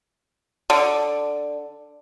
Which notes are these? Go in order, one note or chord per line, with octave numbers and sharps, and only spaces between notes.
D3